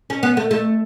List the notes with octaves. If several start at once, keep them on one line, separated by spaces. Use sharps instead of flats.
C#4
B3
A3
A3